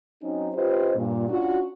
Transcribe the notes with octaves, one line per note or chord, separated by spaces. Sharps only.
F#3 C4 C#4 D#4
C#4 F4 G4 B4 C5 D#5
G2 A#2
C#4 D4 F4 F#4